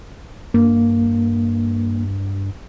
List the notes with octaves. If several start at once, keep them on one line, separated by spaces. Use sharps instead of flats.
G2 A#3